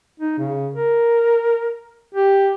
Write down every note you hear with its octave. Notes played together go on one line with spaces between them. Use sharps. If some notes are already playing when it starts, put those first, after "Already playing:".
D#4
C#3
A#4
G4